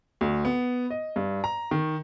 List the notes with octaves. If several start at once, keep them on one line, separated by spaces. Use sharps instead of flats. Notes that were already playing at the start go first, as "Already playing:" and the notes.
D2
B3
D#5
G2
A#5
D#3